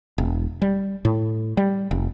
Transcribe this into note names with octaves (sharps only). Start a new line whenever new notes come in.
E1
G3
A2
G3
F1